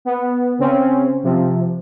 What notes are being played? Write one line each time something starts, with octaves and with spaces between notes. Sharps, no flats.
B3
C#3 C4 C#4
C3 F3